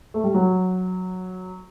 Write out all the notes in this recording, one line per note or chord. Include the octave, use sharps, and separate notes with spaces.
A3
G3
F#3